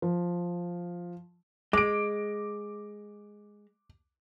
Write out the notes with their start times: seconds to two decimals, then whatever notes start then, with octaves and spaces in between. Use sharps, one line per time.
0.02 F3
1.73 G#3 D6 D7